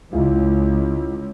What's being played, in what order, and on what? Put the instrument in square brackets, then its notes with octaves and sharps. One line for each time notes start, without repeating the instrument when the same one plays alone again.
[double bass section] C#2 [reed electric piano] G#3 E4 F4